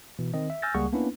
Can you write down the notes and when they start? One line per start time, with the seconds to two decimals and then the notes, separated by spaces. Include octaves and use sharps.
0.19 B2 E3
0.34 D#3 C4 D#5
0.50 E5
0.62 G#5 E6 F6 G6 A6 A#6
0.74 C#2 G3 A#3 G#4 F#5 C#6
0.93 A#3 B3 C#4 D4 E4 B4